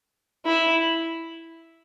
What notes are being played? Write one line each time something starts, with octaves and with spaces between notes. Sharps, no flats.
E4